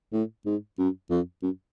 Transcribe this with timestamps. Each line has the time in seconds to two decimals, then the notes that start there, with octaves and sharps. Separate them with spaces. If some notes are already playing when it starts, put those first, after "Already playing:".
0.13 A2
0.46 G#2
0.79 F#2
1.10 F2
1.43 F#2